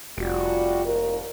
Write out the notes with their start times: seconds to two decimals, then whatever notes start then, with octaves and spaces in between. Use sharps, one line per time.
0.18 F1 G3 F4 F#4
0.85 D#2 A#4